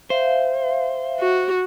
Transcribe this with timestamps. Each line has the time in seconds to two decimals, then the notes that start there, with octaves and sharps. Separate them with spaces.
0.10 C5 E5 F5
1.20 F#4